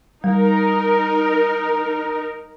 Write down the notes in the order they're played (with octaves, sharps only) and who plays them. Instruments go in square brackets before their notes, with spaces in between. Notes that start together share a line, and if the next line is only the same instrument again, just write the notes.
[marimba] G3 [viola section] D#4 A#4